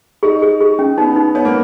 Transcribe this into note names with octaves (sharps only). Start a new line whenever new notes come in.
D#4 G#4
G#4
G#4
C#4
B3 D#4
D#4
B3 C#5
A#3